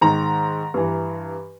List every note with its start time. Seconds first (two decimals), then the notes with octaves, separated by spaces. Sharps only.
0.01 G#2 D#3 A#5
0.74 G2 E3